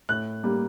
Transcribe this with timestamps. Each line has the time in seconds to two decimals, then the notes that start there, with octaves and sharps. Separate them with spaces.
0.09 A2 F#6
0.43 G3 A#3